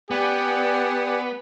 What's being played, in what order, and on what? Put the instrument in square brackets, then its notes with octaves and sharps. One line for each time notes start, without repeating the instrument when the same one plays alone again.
[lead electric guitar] B3 [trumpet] G4 [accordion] D5 F#5 G#5